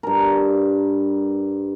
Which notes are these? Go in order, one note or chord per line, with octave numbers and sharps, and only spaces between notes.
G2 A#4